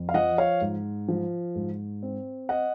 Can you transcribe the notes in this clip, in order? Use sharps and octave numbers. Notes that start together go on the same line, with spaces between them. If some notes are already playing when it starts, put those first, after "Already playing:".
Already playing: F2
F5
F3 D#5 F#5
C#5 F5
G#2
F3
G#2
C4
D#5 F#5